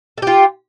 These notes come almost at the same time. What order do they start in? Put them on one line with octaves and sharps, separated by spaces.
A4 G4 F4